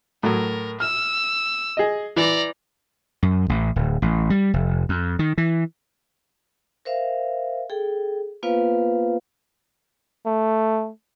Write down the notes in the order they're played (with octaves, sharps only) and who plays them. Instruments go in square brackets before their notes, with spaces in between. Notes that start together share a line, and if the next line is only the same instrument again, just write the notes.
[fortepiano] A2 F#3 [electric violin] A#4
[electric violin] E6 [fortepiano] F6
[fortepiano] G#4 D#5
[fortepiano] E3 [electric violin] D5 A#5
[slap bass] F#2
A1
D1
A1
G3
F1
F2
D#3
E3
[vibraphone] A#4 C5 E5 F5
G#4 A4 G5
A#3 B3 F4 B4 C5 F5
[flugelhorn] A3